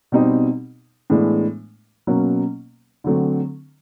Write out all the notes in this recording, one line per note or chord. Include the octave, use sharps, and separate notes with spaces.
B2 G3 C4 D#4
A2 E3 G#3 B3 D4
B2 F#3 A#3 C#4
D3 F#3 A3 C4